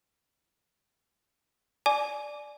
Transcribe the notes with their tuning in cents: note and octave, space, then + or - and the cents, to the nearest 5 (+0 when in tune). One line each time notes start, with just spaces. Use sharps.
D5 +0 G#5 +30 D6 -10